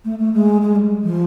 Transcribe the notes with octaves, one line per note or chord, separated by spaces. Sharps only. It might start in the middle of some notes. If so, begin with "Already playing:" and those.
A3
A3
G#3
G#3
G3
F3